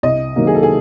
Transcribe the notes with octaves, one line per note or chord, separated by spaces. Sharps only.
C2 D#5
C3 D#3 F#3 A#3
G#4
A4
G#4